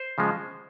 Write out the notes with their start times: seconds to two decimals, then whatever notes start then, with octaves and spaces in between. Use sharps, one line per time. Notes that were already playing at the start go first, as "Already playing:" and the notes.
Already playing: C5
0.18 C#3 F3 G#3